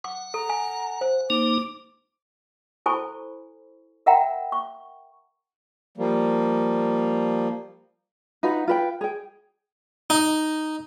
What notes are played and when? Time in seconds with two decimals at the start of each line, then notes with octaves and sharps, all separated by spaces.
0.04 F#5 D6
0.34 A4 A#5
0.49 G#5
1.01 C5
1.30 A#3 D#4 D6
2.86 E4 A4 C5 G#5 B5 C#6
4.06 A#4 E5 F#5 G5 A#5 B5
4.52 C#6
5.98 F3 G3 A#3
8.43 D#4 F4 F#4 B4
8.68 F4 B4 G5
9.01 G#4 G5
10.10 D#4